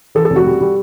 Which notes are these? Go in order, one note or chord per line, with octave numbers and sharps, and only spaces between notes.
E3 A4
A4
F1
F#4
G3
G3